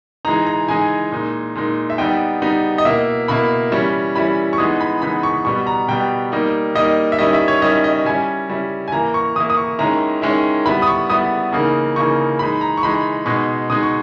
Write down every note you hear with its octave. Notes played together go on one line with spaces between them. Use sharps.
E3 G#3 D#4 A#5
A#5
E3 G#3 D#4 G#5
A#2 G#3 D#4
A#2 G#3 D#4
E5
G3 B3 D#4 G5
G3 B3 D#4
D#5
B2 A#3 E4 E5
B2 A#3 E4 B5
E3 G3 C#4 E4
E3 G3 C#4 E4 B5
C#6
E3 G#3 B3 D#4 D#6
B5
E3 G#3 B3 D#4 B5
C#6
B2 G3 B3 C#6
A#5
B2 G3 B3 G5
G3 A#3 D#4
G3 A#3 D#4 D#5
E5
D#3 G3 C#4 E4 D#5
E5
C#5
D#3 G3 C#4 E4 D#5
D#5
G3 C#4 E4 G#5
G3 C#4 E4
G#5
E3 A#3 E4 A#5
C#6
E3 A#3 E4 D#6
D#6
C#6
D#3 G#3 C#4 E4 A#5
D#3 G#3 C#4 E4
G3 B3 E4 B5
D#6
C#6
G3 B3 E4 D#6
C#3 E3 A#3 D#4
C#3 E3 A#3 D#4 C#6
E3 G#3 D#4 B5
A#5
C#6
E3 G#3 D#4 B5
B2 G#3 D#4 C#6
B2 G#3 D#4 D#6
C#6